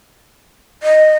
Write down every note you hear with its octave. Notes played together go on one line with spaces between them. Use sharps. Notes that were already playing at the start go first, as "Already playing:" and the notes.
D#5